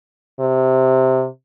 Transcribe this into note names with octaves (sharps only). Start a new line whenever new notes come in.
C3